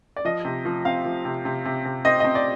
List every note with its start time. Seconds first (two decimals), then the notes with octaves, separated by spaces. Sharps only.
0.16 D5
0.25 F3 D#5
0.45 C3
0.65 F3
0.85 C4 F5
1.05 F3
1.25 C3
1.45 C3
1.65 C3
1.85 C3
2.05 C4 D#5
2.20 D#5
2.25 C4
2.35 D5